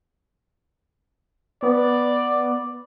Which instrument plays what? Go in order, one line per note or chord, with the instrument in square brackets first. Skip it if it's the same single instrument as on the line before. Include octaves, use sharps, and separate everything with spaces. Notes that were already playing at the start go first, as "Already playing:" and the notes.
[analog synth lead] B3 [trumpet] D5